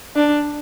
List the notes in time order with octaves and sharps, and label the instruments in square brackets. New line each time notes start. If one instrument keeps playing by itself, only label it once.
[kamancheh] D4